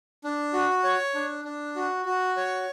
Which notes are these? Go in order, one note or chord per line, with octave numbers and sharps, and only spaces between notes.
D4
F#4
C#5
D4
D4
F#4
F#4
C#5